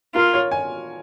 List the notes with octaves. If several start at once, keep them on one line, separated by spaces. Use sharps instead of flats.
F4 A#4
C#5
G#5